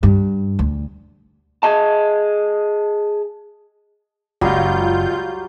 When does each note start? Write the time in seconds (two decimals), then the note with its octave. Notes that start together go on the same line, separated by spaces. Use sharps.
0.03 G2
0.59 D2
1.63 G#4 D#5 A5
4.41 F#1 C#2 F#3 G3 F4 F5 G6